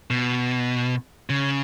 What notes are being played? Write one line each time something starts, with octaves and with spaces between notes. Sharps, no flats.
B2
C#3